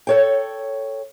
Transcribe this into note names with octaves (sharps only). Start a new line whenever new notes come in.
A4 C#5 G5